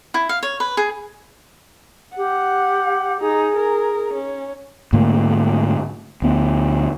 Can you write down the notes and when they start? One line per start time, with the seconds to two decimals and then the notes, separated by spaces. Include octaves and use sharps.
0.14 E4
0.29 F5
0.43 C#5
0.60 B4
0.77 G#4
2.16 G4 F#5
3.21 D#4 G#4
3.56 A#4
4.14 C#4
4.93 G#2 D3 A3 A#3
6.22 D2 B3